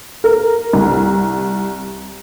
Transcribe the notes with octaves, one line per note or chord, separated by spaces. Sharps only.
A#4
C2